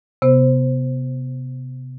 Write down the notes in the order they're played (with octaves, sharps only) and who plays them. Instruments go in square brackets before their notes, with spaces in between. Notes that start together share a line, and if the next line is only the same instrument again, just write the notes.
[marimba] C3 B3 C5